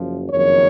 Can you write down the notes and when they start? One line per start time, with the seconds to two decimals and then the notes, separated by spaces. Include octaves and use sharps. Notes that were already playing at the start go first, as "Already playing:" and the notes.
Already playing: F#1 F#2 F3
0.30 F#1 F2 D#3 C#5